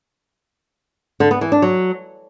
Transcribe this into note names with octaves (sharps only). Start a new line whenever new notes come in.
D3
B3
E3
D4
F#3